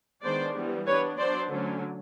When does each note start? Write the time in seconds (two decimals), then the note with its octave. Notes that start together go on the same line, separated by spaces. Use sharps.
0.23 D#3 G#3 B3 D4 C5 D5
0.55 E3 G3 B3
0.86 G3 B3 D4 B4 C#5
1.17 F#3 B3 D4 C5 D5
1.50 D3 F#3 A3 C#4